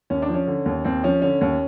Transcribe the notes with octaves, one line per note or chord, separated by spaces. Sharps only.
D#2 C#4
D4
F3
C#4
D3
D#2
D#2 C4
F3 C#4
D3 C#4
D#2 C#4